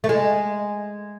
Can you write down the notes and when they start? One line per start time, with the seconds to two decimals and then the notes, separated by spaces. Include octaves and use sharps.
0.04 A3
0.09 G#3